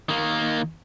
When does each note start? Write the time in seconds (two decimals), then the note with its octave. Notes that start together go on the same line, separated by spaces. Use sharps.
0.09 D#3 A#3